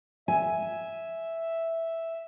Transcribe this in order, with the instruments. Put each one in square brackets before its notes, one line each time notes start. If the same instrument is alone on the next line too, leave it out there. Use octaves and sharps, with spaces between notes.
[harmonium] E5 [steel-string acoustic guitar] G#5